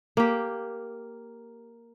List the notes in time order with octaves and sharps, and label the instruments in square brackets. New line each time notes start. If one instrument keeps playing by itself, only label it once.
[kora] A#3 G4